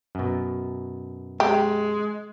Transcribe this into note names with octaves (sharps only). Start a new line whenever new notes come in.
F#2 B2
G#3 G4